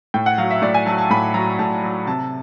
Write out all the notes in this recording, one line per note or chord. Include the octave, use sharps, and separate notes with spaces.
A2 G5
F#5
F#3 F5
E5
A2 D5
G#5
F#3 A5
A5
A2 B5
F#3 A#5
A2 A5
F#3
C3 A5